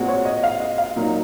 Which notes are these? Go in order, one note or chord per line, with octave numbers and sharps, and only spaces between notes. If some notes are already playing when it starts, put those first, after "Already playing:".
Already playing: A#2 G#3 C4 F#4
C#5
D#5
F5
D#5
F5
A#2 F#3 A#3 D#4